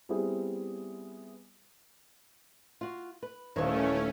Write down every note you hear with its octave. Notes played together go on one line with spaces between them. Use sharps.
G3 B3 C4 E4 G#4
F4 F#4
B4
D#1 D#3 E3 A3 C#4 C#5